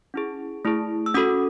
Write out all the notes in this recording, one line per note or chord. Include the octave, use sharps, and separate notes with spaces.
C#4 E4 G#4
A3 E4 G#4
E6
C#4 F#4 A4 D#6